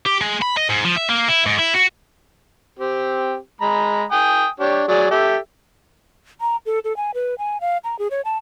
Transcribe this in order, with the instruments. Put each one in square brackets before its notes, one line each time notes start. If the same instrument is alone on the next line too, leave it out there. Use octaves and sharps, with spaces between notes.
[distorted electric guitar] G4
G#3
B5
D#5
G#2
F3
E5
A#3
E4
G#2
E4
F#4
[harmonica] C4 G4
G#3 A#5 B5
G5 G#5 D#6
D4 G4 C#5
F#3 G#4 D5
G4 A4 E5
[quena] A#5
A4
A4
G#5
B4
G#5
F5
A#5
G#4
C#5
A5